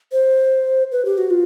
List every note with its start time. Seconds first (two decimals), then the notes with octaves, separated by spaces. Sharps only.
0.12 C5
0.92 B4
1.05 G4
1.18 F#4
1.30 F4